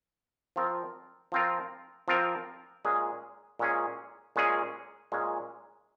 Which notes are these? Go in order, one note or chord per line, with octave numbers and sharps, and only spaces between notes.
F3 C4 F4 A#4
F3 C4 F4 A#4
F3 C4 F4 A#4
A#2 G#3 C#4 G#4
A#2 G#3 C#4 G#4
A#2 G#3 C#4 G#4
A#2 G#3 C#4 G#4